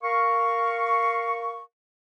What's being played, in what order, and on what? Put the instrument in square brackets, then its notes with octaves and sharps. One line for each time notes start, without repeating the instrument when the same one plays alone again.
[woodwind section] A#4 F5 C#6